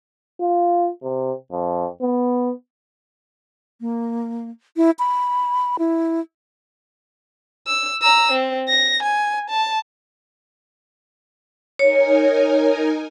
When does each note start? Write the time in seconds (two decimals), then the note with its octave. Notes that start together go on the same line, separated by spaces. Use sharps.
0.41 F4
1.03 C3
1.52 F2
2.02 B3
3.81 A#3
4.77 E4
4.99 B5
5.79 E4
7.67 E6
8.02 A#5 E6
8.32 C4
8.68 A#6
9.03 G#5
9.50 A5
11.79 D#4 A#4 C#5 G#5